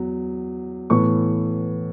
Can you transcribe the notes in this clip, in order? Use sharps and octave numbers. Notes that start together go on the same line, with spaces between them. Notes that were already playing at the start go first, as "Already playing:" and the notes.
Already playing: E2 F#3
A2 E3 B3 C#6